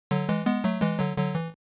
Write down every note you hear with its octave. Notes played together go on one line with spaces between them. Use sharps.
D3 F#3
E3 G#3
G#3 B3
F#3 A3
E3 G#3
D3 F#3
D3 F#3
E3